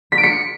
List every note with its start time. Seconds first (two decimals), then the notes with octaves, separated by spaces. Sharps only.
0.12 B6
0.18 D7
0.23 C#7